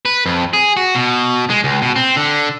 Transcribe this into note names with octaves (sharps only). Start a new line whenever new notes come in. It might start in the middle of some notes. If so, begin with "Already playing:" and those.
B4
F2
G#4
F#4
B2
G#3
C#2
B2
C4
D3